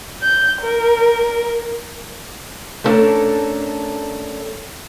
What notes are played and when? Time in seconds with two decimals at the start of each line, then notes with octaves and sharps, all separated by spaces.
0.22 G6
0.61 A#4
2.84 A3 B3 C#4 D4 A4 A#4